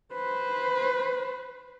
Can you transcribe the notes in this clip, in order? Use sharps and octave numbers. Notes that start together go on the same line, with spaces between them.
B4 C5